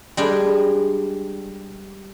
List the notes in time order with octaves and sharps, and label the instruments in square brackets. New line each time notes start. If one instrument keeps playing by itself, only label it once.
[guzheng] G3 G#3 D4 G#4